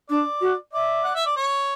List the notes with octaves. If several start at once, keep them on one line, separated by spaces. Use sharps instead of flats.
D4 D5
F#4
D5 E5
F#5
E5
D5
C#5